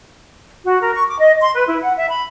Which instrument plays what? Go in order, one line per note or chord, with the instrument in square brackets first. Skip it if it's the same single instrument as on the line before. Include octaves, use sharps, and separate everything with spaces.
[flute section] F#4
A#4
C#6
D6
D#5
C6
B4
E4
F#5
E5
B5